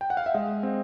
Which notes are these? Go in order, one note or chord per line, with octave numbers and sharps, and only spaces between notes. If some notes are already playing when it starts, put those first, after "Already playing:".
G5
F#5
F5
E5
G#3 D#5
C4